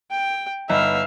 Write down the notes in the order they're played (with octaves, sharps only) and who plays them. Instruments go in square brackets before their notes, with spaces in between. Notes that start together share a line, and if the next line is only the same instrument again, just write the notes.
[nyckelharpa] G5
[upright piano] G1 B3 D#4 [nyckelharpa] E5 F5